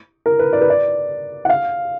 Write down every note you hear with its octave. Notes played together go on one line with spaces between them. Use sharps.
A#4
B4
D5
B4
D5
F#5
F5